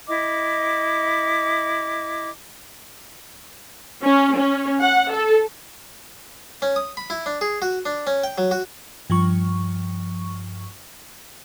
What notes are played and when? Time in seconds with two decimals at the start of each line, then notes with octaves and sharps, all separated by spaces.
0.07 E4 D#5 D6
4.03 C#4
4.36 C#4
4.81 F#5
5.11 A4
6.62 C#4
6.76 D#6
6.97 B5
7.10 E4
7.26 D4
7.41 G#4
7.62 F#4
7.86 D4
8.07 C#4
8.24 G5
8.38 F#3
8.51 F#4
9.10 G2 F3 C#6